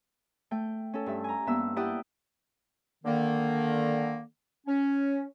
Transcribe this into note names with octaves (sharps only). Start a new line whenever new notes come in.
A3 G5
C#4 A4
G2 E5
G#5 A#5
G2 A#3 B3 E5 E6
E4 G4 D5 F#5 G5 D#6
D3 D#3 A#3
C#4